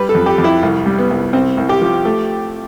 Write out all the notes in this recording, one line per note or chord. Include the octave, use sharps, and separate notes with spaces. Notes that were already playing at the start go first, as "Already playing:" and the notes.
Already playing: G3 B4
A4
F2
G4
F2
E4
C2
G3
B3
C2
C2 C4
C2
G4
F3
A3